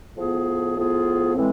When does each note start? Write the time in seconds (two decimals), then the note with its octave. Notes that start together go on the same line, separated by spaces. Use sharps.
0.15 A2 F3 B3 F4 G#4
0.76 A2 F3 B3 F4 G#4
1.35 A2 E3 G#3 C4